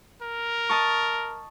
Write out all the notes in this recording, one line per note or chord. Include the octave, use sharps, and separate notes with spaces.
A#4
D#5 A5 C#6